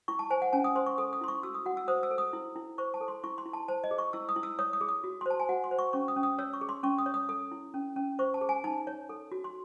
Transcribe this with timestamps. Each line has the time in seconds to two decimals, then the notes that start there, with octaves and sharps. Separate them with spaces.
0.08 E4 C#6
0.19 A5
0.30 C5 G#5
0.42 F#5
0.53 C#4 G#5
0.64 D#6
0.75 C5 C6
0.86 C#6
0.98 A4 D#6
1.13 D#6
1.21 E4 C6
1.28 C#6
1.43 F#4 E6
1.54 D#6
1.66 F#4 F#5
1.77 E6
1.88 C5 D#6
2.03 E6
2.11 A4
2.18 D#6
2.33 E4
2.56 E4
2.78 C5 C#6
2.94 A5
3.01 A4
3.08 C6
3.24 E4 C#6
3.38 C6
3.46 E4
3.53 A5
3.68 C5 A5
3.84 D#5
3.91 G#4
3.98 C#6
4.13 E4 E6
4.29 D#6
4.36 E4
4.43 E6
4.59 C#5 D#6
4.73 D#6
4.81 G#4
4.89 D#6
5.04 F#4
5.21 C6
5.26 C5 A5
5.40 G#5
5.49 F#4 F#5
5.64 C6
5.71 C5
5.79 C#6
5.93 C#4 C#6
6.08 D#6
6.16 C#4
6.23 D#6
6.39 C#5 E6
6.53 C#6
6.61 G#4
6.69 C6
6.83 C#4 C#6
6.98 D#6
7.06 C#5
7.14 D#6
7.29 A4 D#6
7.52 E4
7.74 C#4
7.96 C#4
8.19 C5 C#6
8.34 A5
8.41 G#4
8.49 G#5
8.64 D#4 A5
8.87 C#5
9.09 A4
9.32 F#4
9.44 C6